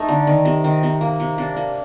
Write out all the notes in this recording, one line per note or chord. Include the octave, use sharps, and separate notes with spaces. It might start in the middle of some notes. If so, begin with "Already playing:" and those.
Already playing: A3 D#4
D3
D#3
C3
D#3 C4
C3
A#3
C3
C3 D4
A#3